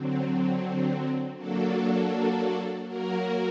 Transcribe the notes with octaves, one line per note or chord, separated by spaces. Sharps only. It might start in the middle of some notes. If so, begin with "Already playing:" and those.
Already playing: D3 F#3 C4
F#3 A#3 D4 F#4 A4
F#3 A#3 F#4 A#4